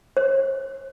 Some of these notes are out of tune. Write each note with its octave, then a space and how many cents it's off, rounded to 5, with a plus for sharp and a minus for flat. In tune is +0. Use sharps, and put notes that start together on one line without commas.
C#5 -45